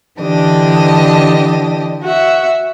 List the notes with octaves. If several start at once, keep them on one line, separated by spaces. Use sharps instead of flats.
D3 E3 D4 G4 D#5
F#4 E5